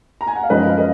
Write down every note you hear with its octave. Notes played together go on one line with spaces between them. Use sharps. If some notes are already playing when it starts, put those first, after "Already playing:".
A#5
G#5
F#5
F5
F#2 F3 G#3 C#4 B4 D#5
F5
B4 D#5